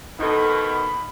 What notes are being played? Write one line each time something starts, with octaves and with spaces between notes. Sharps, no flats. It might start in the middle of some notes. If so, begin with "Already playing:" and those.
B2 D#3 D#4 A4 B5